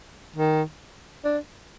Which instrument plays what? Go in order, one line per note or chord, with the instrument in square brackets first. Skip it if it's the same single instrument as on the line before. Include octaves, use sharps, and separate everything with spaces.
[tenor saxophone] D#3
D4